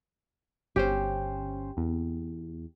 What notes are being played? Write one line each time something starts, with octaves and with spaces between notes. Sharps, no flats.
G1 C#4 G4 C5
E2